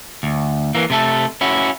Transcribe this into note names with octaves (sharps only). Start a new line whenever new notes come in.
D2
E3 A#3
C3 A3 A4
C#4 E4 F#4